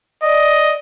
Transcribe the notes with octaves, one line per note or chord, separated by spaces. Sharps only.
D5 D#5